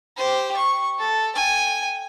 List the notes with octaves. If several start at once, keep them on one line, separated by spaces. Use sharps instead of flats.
G4 C5
C#6
A4
G5 G#5